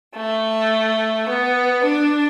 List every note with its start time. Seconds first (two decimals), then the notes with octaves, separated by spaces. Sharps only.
0.14 A3
1.28 B3
1.83 D4